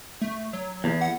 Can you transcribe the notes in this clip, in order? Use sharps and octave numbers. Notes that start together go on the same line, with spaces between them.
A3
F#3
E2
F#5